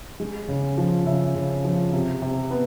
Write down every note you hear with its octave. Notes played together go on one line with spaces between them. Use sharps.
G#3
C#3
F3
C#3 E5
C#3
F3
C3
C3
B3